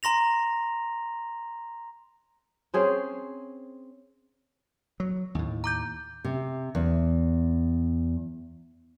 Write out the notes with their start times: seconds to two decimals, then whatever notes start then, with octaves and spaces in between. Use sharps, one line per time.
0.03 A#5 C6 A#6 F7
2.74 C4 C#4 G#4 C5
5.00 F#3
5.35 D#2 A2
5.64 A#5 D6 G6
6.24 C3
6.75 E2